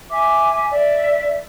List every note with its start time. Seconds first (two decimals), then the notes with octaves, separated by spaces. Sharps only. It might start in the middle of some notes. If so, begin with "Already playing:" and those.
0.12 E5 G#5 D6
0.71 D5 E5